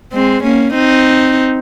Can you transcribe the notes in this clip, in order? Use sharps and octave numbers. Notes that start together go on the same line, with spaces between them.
G#3 C4
A#3 C#4
C4 D#4